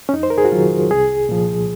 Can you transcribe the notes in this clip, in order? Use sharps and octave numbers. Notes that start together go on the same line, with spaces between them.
C#4
F2 D#4
C5
A#4
G#4
F#4
D#3 F#3 F4
C2 G#4
A#2 F3